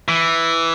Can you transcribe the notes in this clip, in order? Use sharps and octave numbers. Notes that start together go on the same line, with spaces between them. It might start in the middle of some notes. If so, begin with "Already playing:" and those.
E3